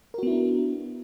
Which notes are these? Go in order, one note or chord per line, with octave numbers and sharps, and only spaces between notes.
B3 D4 E4 F#4 A#4